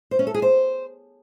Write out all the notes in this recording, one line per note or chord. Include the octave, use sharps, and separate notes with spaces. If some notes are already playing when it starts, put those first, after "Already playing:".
C5
C#4
A4
G#4
C5